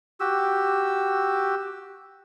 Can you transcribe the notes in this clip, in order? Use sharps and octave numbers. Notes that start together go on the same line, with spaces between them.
F#4 G4 E6